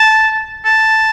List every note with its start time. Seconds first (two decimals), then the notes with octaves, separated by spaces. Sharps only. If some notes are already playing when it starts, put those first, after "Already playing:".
Already playing: A5
0.65 A5